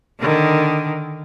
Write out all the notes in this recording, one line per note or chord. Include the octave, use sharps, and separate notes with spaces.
D3 D#3